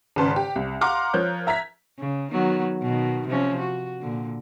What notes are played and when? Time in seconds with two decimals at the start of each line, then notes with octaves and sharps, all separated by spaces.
0.16 G#1 C#3 B4 A5 C6
0.36 G4
0.56 C2
0.81 F5 F#5 A#5 C6 D6 F6
1.14 F3 A#4 C#5 F#6 G6
1.47 E5 A#5 G#6 B6
1.99 C#3
2.31 D#3 F#3 B3
2.82 B2 D#3
3.28 C3 F3 C#4
3.59 F#4
4.00 A#2 D3